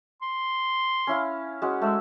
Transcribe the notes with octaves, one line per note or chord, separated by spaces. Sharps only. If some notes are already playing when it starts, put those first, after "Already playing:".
C6
C#4 E4 F5
G#3 C#4 F#4
G#3 A3 E6